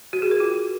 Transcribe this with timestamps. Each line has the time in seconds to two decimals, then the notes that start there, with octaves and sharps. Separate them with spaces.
0.13 F#4
0.22 G#4
0.31 A#4
0.40 F4